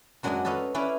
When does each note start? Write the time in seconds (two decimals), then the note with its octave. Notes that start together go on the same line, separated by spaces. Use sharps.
0.23 F#2 F#3 G#3 D4 D#5 G#5
0.45 A4 B4 C#5 D#5 F5
0.74 C#4 E4 B4 D5 F5